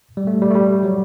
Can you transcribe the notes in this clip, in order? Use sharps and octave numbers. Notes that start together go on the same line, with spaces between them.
G3
A3
G3
A3
G3
F#3